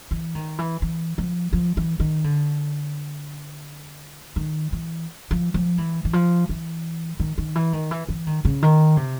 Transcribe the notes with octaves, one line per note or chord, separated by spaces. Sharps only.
E3
D#3
E3
E3
F3
F3
E3
D#3
D3
D#3
E3
F3
F3
E3
E3
F3
E3
D#3
D#3
E3
D#3
E3
E3
D#3
C#3
D#3
C3